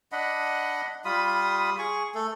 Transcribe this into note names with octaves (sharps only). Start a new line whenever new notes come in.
D4 D#5 F#5 B5
G3 F4 B5 D#6
G#4 C#6
A3 A4